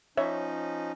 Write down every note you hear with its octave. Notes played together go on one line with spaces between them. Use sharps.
F3 C#4 D#4 C#5 E5